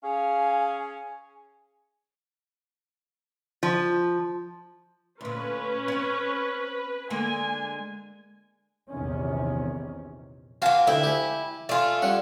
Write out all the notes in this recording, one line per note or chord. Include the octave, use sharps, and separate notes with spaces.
C#4 G#4 F5 G#5
F3
D2 A#2 C#4 B4
C4 C#5
D3 G#3 A#3 G#5
A#1 E2 C3 D#3 C#4
A#3 F4 F#4 G#5 A5
D2 E4 G5
G4 G#5
A3 F4 D5 G#5
G3 C#4 F#5